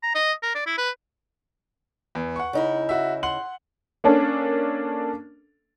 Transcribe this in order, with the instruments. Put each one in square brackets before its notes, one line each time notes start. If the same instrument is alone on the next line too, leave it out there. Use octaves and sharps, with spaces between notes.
[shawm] A#5
D#5
A#4
D5
E4
B4
[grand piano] E2
F#5 C#6
[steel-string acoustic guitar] C#3 D#4 E4
[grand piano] F#4 E5
F#5 C6 F#7
[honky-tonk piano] A#3 C#4 D4 A4